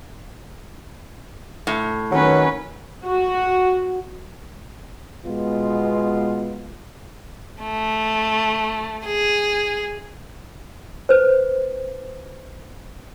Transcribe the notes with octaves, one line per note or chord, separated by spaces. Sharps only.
A2
D#3 F#3 C#4 B4
F#4
B2 G#3 B3 F4
A3
G#4
B4 C5